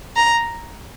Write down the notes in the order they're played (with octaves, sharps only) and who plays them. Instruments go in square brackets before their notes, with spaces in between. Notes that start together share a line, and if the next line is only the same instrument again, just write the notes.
[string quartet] A#5